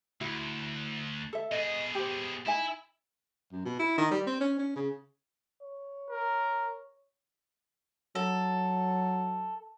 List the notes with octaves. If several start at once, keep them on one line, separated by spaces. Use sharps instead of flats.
D2 E4 F#4
A4 E5
B2 G#4 D#5
G4 C5
D#4 E4 E5 G#5
F#2
B2
E4
D#3
G3
C4
C#4
C#4
C#3
C#5
A#4
F#3 A4